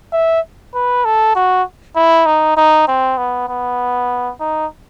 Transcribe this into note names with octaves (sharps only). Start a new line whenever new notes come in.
E5
B4
A4
F#4
E4
D#4
D#4
C4
B3
B3
D#4